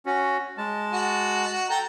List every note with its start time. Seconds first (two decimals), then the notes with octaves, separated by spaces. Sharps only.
0.06 C#4 F#4
0.58 G#3 A5
0.92 F#4
1.70 A4 G5 A#5